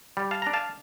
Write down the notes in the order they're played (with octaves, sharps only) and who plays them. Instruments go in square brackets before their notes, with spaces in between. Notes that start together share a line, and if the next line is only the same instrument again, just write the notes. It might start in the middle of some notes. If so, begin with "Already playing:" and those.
[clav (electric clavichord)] G3
F5 A5
D4 A#5
F5 A5